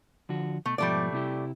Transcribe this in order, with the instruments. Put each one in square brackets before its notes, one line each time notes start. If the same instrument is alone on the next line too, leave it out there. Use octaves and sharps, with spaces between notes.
[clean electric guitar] D3 F3 F#4
[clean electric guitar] B2 [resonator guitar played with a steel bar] A3
[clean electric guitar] G#2 B2 F3 [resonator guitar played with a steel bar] G3 A3 D5
[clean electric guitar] C3 E4 G4